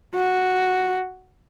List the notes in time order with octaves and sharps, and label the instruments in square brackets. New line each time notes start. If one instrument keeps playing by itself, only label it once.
[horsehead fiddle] F#4